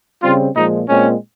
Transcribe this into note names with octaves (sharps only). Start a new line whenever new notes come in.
C#3 G3 C4 F4
A#2 F3 G#3 D#4
A#2 G#3 C4 C#4